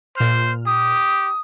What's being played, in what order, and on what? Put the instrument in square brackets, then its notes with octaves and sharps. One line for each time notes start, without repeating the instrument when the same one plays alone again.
[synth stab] A#2 F6 [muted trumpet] C5
[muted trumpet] G4 [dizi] D#6